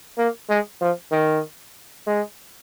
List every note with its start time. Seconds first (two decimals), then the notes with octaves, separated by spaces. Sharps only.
0.18 A#3
0.50 G#3
0.81 F3
1.12 D#3
2.07 G#3